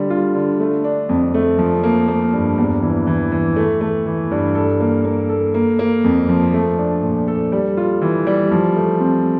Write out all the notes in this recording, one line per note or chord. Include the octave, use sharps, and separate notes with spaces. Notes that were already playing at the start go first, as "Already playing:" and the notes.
Already playing: D3 G3
F4
D3
A3
D4
F2
A3
F3
A#3
A#3
G2
E2
E3
E3
E3
A3
A3
E3
G2
A4
A#3
A#3
A4
A#3
A#3
F2
F3
A3
D4
A#2
A4
G3
F4
E3
G3
F3
A3
C4